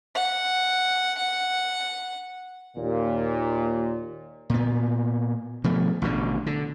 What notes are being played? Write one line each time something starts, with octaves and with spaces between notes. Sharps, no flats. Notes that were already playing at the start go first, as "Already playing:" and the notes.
F#5
F#5
D#2 A#2
A#2 B3
B2 F3 A3
A1 B2 D3
D3